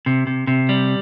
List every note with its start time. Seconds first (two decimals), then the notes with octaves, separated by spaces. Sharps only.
0.06 C3
0.27 C3
0.47 C3
0.69 G3